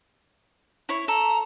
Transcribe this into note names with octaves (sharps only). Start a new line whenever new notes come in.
E4 C#5
A4 A#5